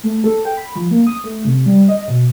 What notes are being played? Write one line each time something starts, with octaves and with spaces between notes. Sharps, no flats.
A3
A4
G5
B5
F3
A#3
D#6
A3
C3
G3
D#5
B2